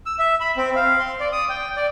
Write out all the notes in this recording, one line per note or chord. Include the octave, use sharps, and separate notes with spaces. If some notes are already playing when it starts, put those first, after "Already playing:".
E6
E5
B5
C4
F5
C6
D5
D#6
G5
D5